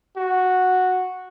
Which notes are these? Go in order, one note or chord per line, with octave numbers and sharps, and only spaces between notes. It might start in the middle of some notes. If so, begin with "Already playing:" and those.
F#4